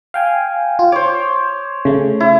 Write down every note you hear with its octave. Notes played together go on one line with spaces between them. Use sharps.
F5 G5 G#5
F4
C5 C#5 D6
C#3 A3
E4